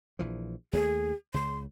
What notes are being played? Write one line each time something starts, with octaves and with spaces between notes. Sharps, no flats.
A#1 E3 F3
D#2 G3 A3 G#4
C#2 C#3 C6